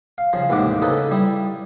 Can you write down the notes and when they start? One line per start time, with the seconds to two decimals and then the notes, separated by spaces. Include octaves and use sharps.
0.18 F5
0.33 C#3 F3
0.50 A1 D#2 G#2 C3 F#5 D6
0.82 C#3 D#4 A4 B4
1.11 G3 E4